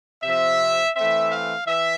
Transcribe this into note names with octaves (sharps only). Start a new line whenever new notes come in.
C3 F3 C4 E5
E3 A3 C4 E5
F5
E3 E5